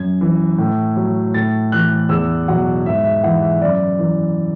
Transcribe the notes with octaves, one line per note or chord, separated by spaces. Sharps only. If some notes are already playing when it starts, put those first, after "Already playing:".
Already playing: F#2 G#6
E3
A2
F#3
A2 A6
E3 F#6
E2 E6
B2 F#3 F#5
G#2 E5
E5
E3 F#5
E5
F#2 D5
E3